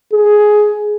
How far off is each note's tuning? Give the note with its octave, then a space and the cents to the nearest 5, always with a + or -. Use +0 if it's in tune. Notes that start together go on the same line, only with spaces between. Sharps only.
G#4 +10